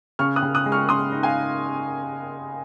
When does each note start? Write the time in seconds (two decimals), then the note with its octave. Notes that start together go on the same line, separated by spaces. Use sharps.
0.19 C#3 C#6 F6
0.36 D#6 F#6
0.42 C#3
0.55 D#6 F#6
0.66 G#3
0.72 C#6 F6
0.89 C#3 C6 D#6
1.12 D#4
1.23 F5 G#5